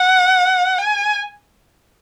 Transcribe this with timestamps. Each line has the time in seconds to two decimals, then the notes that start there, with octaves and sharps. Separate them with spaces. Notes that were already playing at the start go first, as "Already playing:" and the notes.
Already playing: F#5
0.78 G#5